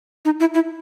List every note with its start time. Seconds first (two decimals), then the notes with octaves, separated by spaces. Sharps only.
0.25 D#4
0.40 E4
0.54 E4